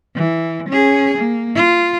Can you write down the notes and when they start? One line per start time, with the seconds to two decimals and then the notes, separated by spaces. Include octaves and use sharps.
0.15 E3
0.69 C#4 G#4
1.17 A#3
1.55 F4